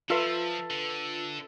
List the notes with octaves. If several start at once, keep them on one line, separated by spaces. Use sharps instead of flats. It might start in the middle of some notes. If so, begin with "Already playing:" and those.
F3 F4 A4 B4 E5 C6
D3